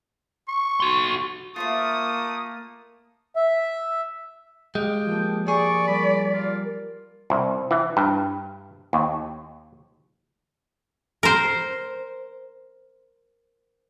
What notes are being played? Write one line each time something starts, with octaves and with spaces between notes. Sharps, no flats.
C#6
F#4 C6
A3 A#3 F4 C5 E5 D#6
E5
G#3 G4 F5 G5 D#6
F3 A#3
G#4 D5 C#6
G3 A#4 B5 A6
F4 A#4
C2
E3
G2
D#2
A#4 C5